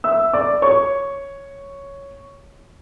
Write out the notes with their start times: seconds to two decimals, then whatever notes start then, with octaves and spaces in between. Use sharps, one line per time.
0.04 E5 E6
0.33 D5 D6
0.62 C#5 C#6